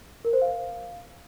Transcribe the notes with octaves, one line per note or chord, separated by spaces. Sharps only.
A#4
C5
F5